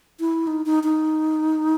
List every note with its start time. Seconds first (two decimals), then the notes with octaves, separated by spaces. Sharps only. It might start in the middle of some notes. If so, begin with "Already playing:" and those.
0.20 E4
0.47 D#4
0.66 D#4
0.84 D#4